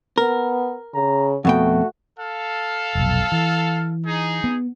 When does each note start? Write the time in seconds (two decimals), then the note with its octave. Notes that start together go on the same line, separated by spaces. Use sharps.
0.18 B3 A#4
0.94 C#3 A#5
1.45 F2 B2 A3 F#4 G5
2.18 A4 F5
2.95 F1 B1
3.32 E3
4.05 D#4 G#4
4.44 B3